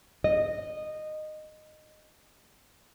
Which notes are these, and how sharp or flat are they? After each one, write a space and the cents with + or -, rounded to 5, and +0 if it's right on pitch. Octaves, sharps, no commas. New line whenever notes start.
D#5 -15